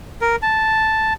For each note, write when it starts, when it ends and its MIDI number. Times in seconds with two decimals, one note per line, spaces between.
0.21 0.36 70
0.42 1.13 81